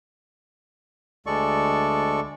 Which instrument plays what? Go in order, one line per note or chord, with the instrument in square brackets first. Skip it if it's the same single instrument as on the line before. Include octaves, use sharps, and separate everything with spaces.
[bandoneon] D2 G#3 A4 D5 C#6